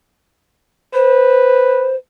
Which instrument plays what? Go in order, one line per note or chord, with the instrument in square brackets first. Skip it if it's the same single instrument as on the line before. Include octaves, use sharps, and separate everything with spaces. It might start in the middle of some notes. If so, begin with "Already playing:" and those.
[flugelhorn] B4 [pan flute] C5